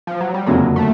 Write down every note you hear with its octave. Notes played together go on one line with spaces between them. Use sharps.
F3
F#3
G3
F#1 F2 D3 F#3 G#3 A#3
A3